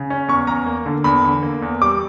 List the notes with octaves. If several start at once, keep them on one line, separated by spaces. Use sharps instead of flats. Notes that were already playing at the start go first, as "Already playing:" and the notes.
Already playing: C#3
C#4
E2 C#6
E2 A#5
A#3
D3
E2 B5
D3
A#3
E2
G3 D6